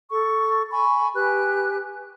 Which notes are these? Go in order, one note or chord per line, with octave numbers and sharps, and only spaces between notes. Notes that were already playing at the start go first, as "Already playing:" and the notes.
A4 C#6
G#5 B5 C#6
G4 B4 G#5 F#6